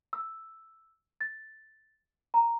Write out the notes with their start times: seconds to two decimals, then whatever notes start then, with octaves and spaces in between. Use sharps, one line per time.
0.13 E6
1.21 A6
2.34 A#5